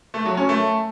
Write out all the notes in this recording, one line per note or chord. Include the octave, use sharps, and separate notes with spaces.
A3
F#3
C#4
A3